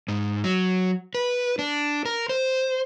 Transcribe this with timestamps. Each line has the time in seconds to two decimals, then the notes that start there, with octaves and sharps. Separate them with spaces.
0.08 G#2
0.44 F#3
1.15 B4
1.59 D4
2.05 A#4
2.29 C5